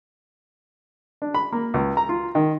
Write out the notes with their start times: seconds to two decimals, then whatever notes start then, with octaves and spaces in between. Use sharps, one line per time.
1.22 D4
1.34 B5
1.53 A#3
1.74 C#2
1.97 A#5
2.09 F4
2.35 D#3